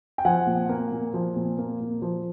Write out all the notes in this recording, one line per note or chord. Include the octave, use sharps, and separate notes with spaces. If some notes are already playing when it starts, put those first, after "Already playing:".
G5
F3 F#5 G#5
A#2
A#3
A#2
F3
A#2
A#3
A#2
F3